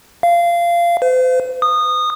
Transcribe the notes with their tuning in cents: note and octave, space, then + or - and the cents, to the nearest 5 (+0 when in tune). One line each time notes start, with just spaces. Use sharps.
F5 -20
C5 -45
D#6 -20